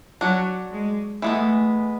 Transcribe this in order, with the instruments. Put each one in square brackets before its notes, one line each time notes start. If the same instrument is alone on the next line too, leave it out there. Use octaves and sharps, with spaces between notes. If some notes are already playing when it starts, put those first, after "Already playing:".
[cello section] F#3 [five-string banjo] D4 F#4 C#5
[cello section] G#3
[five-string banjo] E3 G#3 B3 [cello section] A3